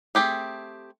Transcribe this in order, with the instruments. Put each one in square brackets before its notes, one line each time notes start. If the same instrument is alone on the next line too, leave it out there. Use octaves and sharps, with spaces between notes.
[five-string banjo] A3 C4 G4 G#4